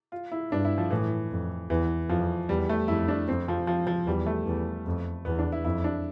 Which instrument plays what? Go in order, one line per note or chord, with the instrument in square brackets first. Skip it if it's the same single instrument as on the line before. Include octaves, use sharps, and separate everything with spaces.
[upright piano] F4
E4
[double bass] G2 [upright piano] D4
[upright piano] E4
F3
[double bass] A2 [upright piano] E3
[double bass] F2
[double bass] E2 [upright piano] E3
[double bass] F2 [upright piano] F3
[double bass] E2 [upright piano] G3
[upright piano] A3
[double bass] F2 [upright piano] E4
[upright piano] D4
[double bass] F2 [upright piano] C4
[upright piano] F3
F3
F3
[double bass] E2 [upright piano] G3
[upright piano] A3
[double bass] E2
F2
[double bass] E2 [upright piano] B3
[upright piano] D4
E4
[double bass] F2 [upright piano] E4
[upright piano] D4